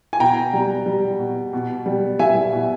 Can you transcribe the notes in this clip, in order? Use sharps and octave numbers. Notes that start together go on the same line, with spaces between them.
G#5
B2 G5 A#5
G3
G3
B2
B2
G3
G3 E5 G#5
B2